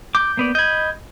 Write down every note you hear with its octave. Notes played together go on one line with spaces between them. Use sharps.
D6 G6
A#3 B3 D5
D#5 B5 G6 G#6